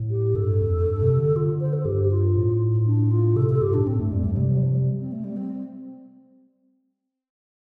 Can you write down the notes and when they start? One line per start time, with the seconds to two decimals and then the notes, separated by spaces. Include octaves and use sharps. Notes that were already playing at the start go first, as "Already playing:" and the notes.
Already playing: A2
0.10 G4
0.35 G2 A4
0.61 F2
0.85 G2
1.02 C3
1.19 D3
1.36 D3 F4
1.61 C5
1.73 A4
1.85 G2 G4
2.04 G4
2.11 F4
2.36 A2
2.86 D4
3.11 F4
3.36 C3 A4
3.49 C3 A4
3.61 G2 G4
3.74 A2 D4
3.87 A2 C4
4.00 G2 A3
4.12 F2 G3
4.24 G2 A3
4.33 F3
4.36 C3 G3
4.50 F3
4.57 G3
4.62 F3
4.75 G3
5.00 C4
5.12 A3
5.24 G3
5.37 C4